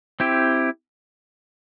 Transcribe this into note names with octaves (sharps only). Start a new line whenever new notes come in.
C4 E4 G4